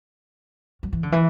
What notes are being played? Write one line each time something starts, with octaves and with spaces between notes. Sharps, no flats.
F#3
E3
D3
E3